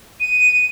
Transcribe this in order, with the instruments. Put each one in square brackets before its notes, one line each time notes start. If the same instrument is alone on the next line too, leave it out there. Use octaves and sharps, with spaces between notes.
[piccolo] D#7